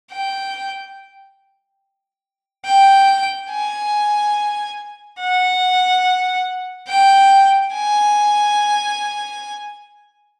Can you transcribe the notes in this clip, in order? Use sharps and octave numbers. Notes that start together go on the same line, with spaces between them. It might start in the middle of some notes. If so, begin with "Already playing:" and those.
G5
G5
G#5
F#5
G5
G#5